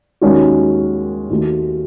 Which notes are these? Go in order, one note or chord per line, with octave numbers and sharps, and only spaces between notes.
D#2 D#3 G#3 C#4 F#4
D#2 D#3 A3 D#4 F#4